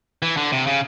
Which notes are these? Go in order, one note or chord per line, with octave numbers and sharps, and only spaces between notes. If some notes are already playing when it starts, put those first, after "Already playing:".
E3
D3
C3
C#3